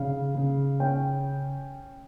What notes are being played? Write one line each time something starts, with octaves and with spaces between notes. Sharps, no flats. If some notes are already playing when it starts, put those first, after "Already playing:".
Already playing: C#3 F5
C#3
C#4 G5